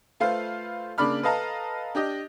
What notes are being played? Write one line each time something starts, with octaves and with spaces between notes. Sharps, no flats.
A3 F4 B4 C5 F5
C#3 A#3 D4 D5 B5 F6
A4 B4 D#5 F5 A5 A#5
D4 G4 D#5